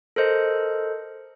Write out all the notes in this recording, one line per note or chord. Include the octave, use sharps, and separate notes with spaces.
A4 A#4 C5 D#5